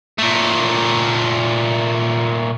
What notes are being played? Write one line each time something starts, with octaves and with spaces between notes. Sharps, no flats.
A#2 A3